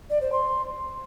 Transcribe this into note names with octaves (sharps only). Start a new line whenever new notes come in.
D5
C5
C6